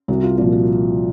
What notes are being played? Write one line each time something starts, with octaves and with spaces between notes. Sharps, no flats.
C2 F#4
F4
A#2 F3 F4
F#4